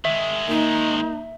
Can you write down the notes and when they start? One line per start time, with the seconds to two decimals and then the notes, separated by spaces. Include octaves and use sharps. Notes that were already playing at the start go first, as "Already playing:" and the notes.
0.05 D#3 G#3 E5
0.48 A#3 D#4